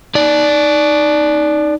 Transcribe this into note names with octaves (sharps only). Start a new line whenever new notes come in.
D#4 D5